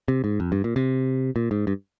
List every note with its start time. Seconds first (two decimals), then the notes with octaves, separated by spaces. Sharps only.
0.08 C3
0.24 G#2
0.40 F2
0.52 G2
0.64 A#2
0.76 C3
1.36 A#2
1.51 G#2
1.67 G2